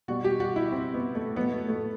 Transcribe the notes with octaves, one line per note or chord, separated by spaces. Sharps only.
B2 G3 F#4
G4
F#4
E4
C4
B3
A3
A2 F#3 B3
A3
A3